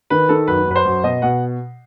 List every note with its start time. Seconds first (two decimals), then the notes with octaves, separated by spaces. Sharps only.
0.10 D#3 B4
0.29 D#3 A4
0.47 F#2 B4
0.66 F#2 B4
0.76 C5
0.85 F#2
1.03 B2 D#5
1.22 B2 F#5